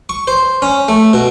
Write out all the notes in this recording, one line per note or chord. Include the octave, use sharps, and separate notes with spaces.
C#6
C5
C#4
A3
B2